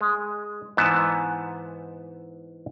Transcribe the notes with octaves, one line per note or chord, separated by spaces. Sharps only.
G#3
G#2 E3 B3 A5